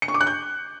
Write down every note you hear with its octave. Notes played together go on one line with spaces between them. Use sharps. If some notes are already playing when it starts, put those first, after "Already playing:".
C#7
C#6
D6
F#6
G6